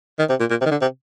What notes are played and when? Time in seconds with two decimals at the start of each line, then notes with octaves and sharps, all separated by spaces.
0.19 D#3
0.29 C3
0.40 A#2
0.50 A#2
0.61 C3
0.65 D#3
0.71 D3
0.81 C3